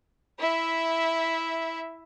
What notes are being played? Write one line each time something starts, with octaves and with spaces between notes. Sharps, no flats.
E4 E5